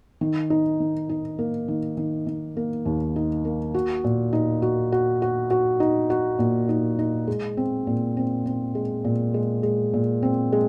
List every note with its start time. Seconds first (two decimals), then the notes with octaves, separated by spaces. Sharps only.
0.21 D#3
0.50 D#4
0.80 D#3
1.09 D#4
1.39 A#3
1.68 D#3
1.97 D#3
2.27 D#3
2.57 A#3
2.85 D#2
3.16 D#4
3.45 A#3
3.74 F#4
4.04 A#2
4.33 D#4
4.62 F#4
4.92 F#4
5.22 F#4
5.51 F#4
5.80 D#4
6.10 F#4
6.39 A#2
6.69 D#4
6.99 D#4
7.27 G#3
7.57 C4
7.87 A#2
8.17 C4
8.46 C4
8.75 G#3
9.04 A#2
9.34 G#3
9.63 G#3
9.94 A#2
10.23 C4
10.52 G#3